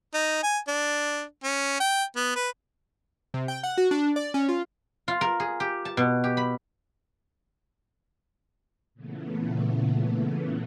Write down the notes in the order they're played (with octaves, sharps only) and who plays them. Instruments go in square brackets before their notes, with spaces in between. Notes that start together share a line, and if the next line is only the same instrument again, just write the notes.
[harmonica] D#4
G#5
D4
C#4
G5
B3
B4
[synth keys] C3
G5
F#5
F#4
D4
D5
C#4
F4
[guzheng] F4
A#4
G#4
G4
A5
B2
G4
B5
[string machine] A#2 C#3 E3 A3 B3